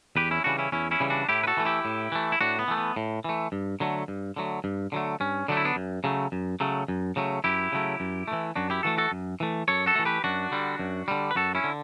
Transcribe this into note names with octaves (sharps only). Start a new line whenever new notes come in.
E2 G4 B4
C#4 E4
C#3 E3 G3 D4 F#4
C#4 E4
E2 C#4 E4
C#4 E4
C#3 E3 G3
D4 F#4
A2 E4 G4
B4
F#4 A4
E3 A3
E4 G4
A2
E3 A3
E4
A2 D4 F#4
B3
E3 A3
B3
A2
E3 A3
G2
D3 F#3 A3
G2
D3 F#3 A3
G2
D3 F#3 A3
G2 C#4
D3 F#3 A3 D4
E4
B3 D4
F#2
C#3 F#3 A3
F#2
C#3 F#3 A3
F#2
C#3 F#3 A3
F#2 E4 G4
C#3 F#3 A3
F#2
A3
E3
F#2 D4 F#4
E4 G4
E3 A3 F#4 A4
F#4 A4
F#2
E3 A3
F#2 A4 C#5
F#4 A4
E3 A3
G4 B4
F#2 D4 F#4
D3 G3
F#2
D3 G3
B4
F#2 F#4 A4
C#4 E4
D3